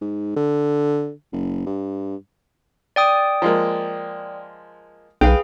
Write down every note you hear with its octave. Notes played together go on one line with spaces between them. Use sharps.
G#2
D3
F#1
G2
D5 G5 D#6
F3 G#3 A#3
B1 G#4 B4 F5 G5